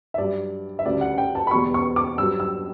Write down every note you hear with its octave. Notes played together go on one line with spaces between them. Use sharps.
E5
G2 F#3 D5
E5
D2 C#3 G3 D5
F#5
G5
A5
B5
E2 B2 G3 C#6
C#6
D6
G2 F#3 E6
E6